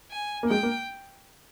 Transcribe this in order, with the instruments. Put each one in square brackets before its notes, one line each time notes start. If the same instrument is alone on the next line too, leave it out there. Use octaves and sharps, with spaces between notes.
[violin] G#5
[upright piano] A#3
[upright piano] G#3 [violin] G5
[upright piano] A#3